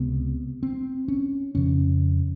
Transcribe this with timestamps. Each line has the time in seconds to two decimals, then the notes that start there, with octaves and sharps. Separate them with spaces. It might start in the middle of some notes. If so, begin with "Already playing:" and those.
Already playing: C#2 C3 B3
0.63 C4
1.08 C#4
1.55 F2 C#3 C#4